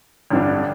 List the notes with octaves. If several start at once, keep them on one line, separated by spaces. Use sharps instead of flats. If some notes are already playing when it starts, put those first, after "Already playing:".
A1 G2 D3 G3 D4